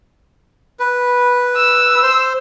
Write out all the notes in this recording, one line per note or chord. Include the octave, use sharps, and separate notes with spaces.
B4
E6
C5